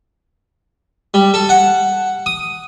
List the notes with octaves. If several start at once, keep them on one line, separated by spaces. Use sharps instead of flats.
G3
A4
F#5
D#6